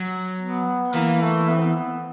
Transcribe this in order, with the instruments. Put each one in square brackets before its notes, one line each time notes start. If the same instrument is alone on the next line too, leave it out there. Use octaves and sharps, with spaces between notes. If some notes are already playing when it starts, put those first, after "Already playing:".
Already playing: [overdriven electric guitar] F#3
[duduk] B3
[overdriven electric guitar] E3 [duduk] A#3
[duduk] A3
B3
C4
B3